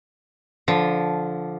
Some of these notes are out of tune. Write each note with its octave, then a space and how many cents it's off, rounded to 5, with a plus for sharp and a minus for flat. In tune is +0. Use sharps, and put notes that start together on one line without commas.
D3 -10 F3 +0